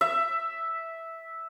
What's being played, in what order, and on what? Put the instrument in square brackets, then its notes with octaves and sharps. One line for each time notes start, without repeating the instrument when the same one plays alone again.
[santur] E5